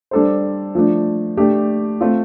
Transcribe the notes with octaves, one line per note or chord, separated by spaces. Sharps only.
G3 D4 A4 C5
F3 A3 D4
A3 D4 G4
A3 C4 F4